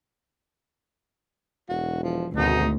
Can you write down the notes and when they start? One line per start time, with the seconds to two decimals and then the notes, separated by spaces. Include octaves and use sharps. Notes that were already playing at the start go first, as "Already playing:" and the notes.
1.69 E1 F#4
2.03 F3
2.37 G#1 D2 B2 D#4